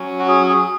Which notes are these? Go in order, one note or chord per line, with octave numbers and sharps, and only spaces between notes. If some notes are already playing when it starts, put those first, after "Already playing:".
Already playing: F#3 C#4
F#4
G#4
G#4